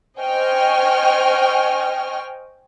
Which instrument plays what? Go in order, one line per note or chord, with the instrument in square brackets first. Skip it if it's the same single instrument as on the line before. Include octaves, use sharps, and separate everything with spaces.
[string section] C5 D#5 G5 G#5 C#6 F6